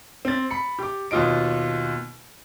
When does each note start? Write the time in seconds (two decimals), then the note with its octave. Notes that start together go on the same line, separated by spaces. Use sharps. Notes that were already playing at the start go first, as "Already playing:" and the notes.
0.25 C4 A6
0.51 B5 C#7
0.79 G4 D6
1.11 D#2 B2 F4 D#5 D7